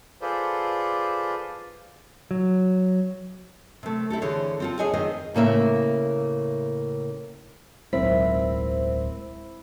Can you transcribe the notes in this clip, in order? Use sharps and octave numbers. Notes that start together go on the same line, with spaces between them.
F4 G#4 A4 B4 C5 D5
F#3
C3 A3
C4 E4 G4 A4
D3 E3 G#4 C5 C#5
C4 F4 A4
G#4 C5 C#5 D#5 F#5 G#5
D#3 C4 G#4 B4 C5 D#5
A2 C#3 A#3 E5
D1 B1 G#3 C4 E4 A#4 B6